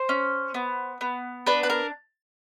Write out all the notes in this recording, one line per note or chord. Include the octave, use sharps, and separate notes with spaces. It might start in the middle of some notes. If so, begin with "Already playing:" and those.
Already playing: C5
C#4
B3
B3
D4 B4
B4
A#4